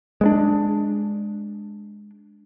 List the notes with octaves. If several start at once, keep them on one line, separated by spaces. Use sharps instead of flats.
G#3 B3 D4